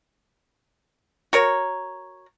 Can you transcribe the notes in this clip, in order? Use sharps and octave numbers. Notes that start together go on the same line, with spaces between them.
F#4 A#4 C#5